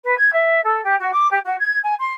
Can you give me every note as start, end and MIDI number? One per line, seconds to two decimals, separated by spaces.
0.03 0.16 71
0.17 0.30 92
0.33 0.60 76
0.63 0.83 69
0.84 0.95 67
0.98 1.10 66
1.12 1.28 86
1.30 1.39 67
1.44 1.55 66
1.60 1.78 92
1.83 1.95 80
1.98 2.13 84